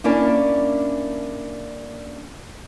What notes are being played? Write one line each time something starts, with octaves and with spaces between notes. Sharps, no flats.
A#3 C#4 D4 E4 A#4 D5